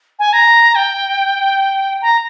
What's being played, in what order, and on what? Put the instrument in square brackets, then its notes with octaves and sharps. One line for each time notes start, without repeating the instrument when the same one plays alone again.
[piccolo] G#5
A#5
G5
A#5